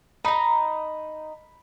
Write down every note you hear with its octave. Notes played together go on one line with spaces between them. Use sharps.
D#4 A#5 B5